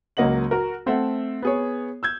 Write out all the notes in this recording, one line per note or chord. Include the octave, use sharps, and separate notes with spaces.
C#2 F#3 A#3 D#5 F#5 F#7
F#4 A#4
A3 C4 A4 E5 F#5
B3 G#4 C#5
E6 G6 G#6